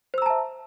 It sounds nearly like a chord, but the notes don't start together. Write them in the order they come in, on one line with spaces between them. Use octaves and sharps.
C5 E6 A#5 A5 E5